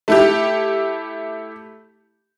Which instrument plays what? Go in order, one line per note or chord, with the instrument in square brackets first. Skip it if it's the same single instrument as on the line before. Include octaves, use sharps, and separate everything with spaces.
[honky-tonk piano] A3 E4 G4